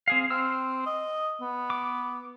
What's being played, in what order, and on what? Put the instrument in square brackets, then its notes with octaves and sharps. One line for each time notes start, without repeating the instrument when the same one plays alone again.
[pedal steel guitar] C4 G#4 F5
[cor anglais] C4 [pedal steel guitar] E6 F6
[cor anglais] D#5
B3
[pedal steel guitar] D6